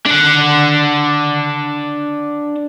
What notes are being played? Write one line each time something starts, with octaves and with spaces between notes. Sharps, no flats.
D4 F#5